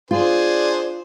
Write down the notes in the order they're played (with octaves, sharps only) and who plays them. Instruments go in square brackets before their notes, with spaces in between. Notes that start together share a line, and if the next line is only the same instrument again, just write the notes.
[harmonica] D4 G#4 C5 [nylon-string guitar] F4